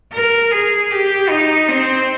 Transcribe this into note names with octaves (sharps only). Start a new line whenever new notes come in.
A#4
G#4
G4
D#4
C4